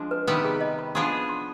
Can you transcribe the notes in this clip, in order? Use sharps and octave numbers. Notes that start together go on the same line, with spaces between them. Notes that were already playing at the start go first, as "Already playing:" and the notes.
Already playing: F3 G#3 D4
B4
C3 D#3 G3 B3 B4
G#4
D#5
B5
F3 B3 D4 F4 G#4 C6
B5
B5
C6